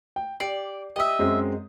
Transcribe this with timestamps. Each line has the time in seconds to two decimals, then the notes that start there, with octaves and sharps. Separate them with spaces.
0.16 G5
0.40 G4 D5 C7
0.96 G4 D#5 E5 D#6
1.19 F#2 G#3 C4